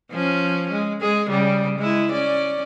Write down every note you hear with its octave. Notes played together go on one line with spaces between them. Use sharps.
F3 C#4
G#3
G#3 G#4
C#3 G3
G#3 E4
C#4 D5